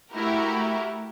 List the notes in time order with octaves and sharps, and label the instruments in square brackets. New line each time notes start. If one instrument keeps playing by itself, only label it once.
[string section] A3 E4 F#4 G4 A#4